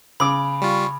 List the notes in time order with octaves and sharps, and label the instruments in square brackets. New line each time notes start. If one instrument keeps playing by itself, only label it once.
[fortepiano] C#3 D6 [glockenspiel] B5
[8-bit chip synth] G3 F4 [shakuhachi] C#6